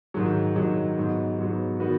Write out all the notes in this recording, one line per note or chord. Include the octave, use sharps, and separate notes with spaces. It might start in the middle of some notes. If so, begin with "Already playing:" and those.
G#2 D#3 F#3
G#2 D#3 F#3
G#2 F#3 B3
G#2 F#3 B3
D#3 B3 F#4 B4